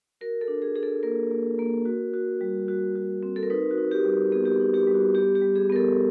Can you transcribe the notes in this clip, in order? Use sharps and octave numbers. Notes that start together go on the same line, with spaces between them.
F#4 A#4
A4
D4
G#4
D4 G#4
A4
A#3 A#4
A#3
A#3
F#4
F#4
G3
F#4
F#4
C4
A4
A#4
D#4 B4
F#4
D#4
G4
G3
B3 G#4
G4
G#4
D#4
G4
G3
F#4
B3 G4
G4
G3
G#4
B3 A#4
A4